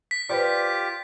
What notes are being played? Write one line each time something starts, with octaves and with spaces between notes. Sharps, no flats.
B6
F4 G4 B4 C5 D5 D6